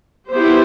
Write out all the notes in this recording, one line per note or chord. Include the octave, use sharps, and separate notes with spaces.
B3 E4 G4 C5